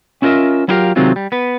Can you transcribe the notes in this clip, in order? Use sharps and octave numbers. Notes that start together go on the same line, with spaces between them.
C#4 E4 F4 A#4 D#5 E5
F#3 E4 F4 G4 A#4 F5
C3 D#3 F#3 G#3 C4 F4
G3
B3 B4